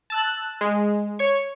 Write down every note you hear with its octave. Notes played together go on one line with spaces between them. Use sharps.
A5 E6 F#6
G#3
C#5 C#6